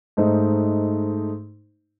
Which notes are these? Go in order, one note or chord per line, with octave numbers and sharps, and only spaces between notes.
G#2 A3 D#4 C5